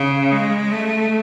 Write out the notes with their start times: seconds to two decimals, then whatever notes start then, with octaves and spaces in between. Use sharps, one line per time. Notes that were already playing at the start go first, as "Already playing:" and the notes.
Already playing: C#3
0.32 G#3
0.72 A3